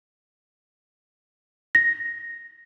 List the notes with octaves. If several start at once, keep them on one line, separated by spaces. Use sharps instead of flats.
A#6